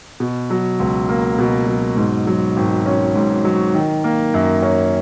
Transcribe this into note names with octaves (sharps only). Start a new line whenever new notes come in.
B2
F#3
C#2
A#3
B2
F#3
G#2
F#3
G#1
C#4
G#2
F#3
D#3
A#3
F#2
C#4